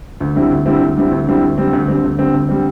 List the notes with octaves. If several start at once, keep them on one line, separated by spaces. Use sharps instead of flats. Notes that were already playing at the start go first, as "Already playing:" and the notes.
D2
D3 G3 C4 E4
D2
D3 G3 C4 E4
D2
D3 G3 C4 E4
D2
D3 G3 C4 E4
D2
D3 G3 C4
D2
D3 G3 C4
D2
D3 G3 C4
D2
D3 G3 C4